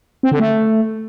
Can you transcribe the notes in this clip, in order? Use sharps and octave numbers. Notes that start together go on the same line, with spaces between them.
C4
D3
A3